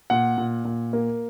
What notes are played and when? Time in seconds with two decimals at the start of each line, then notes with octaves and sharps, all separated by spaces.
0.10 A#2 F#5
0.38 A#2
0.65 A#2
0.93 A#3